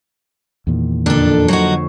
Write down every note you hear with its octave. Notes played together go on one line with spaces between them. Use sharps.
E2 A#2 D#3
F2 D3 A#3 D4 A4
F#3 D#4 F#4 C5 C#5